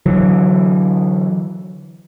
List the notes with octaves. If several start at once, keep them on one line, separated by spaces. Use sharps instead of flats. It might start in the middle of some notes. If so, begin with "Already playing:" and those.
D3 E3 F#3